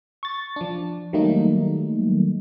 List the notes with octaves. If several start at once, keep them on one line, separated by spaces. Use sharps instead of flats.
C#6 A6
F3 D4
D#3 F#3 G3 A3 A#3 D#4